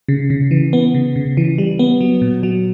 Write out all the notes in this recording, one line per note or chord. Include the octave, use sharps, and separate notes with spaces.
C#3
C#3
E3
B3
C#3
C#3
E3
G3
B3
F#3
A#2
F#3